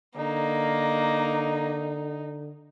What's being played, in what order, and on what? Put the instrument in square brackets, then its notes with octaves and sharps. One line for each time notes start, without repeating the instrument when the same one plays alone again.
[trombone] D3 [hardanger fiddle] A#3 [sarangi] D#4